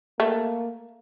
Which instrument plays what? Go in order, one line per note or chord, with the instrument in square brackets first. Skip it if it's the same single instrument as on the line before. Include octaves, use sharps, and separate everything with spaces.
[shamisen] A3 [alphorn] A#3